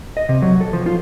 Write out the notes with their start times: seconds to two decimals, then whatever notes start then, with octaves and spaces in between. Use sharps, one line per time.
0.17 D#5
0.29 C3
0.42 F#3
0.61 A4
0.73 F3
0.86 F4